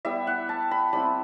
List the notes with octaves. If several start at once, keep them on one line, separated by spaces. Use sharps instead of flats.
G3 B3 E4 E5
F#5
A5
B5
G3 C4 E4 B5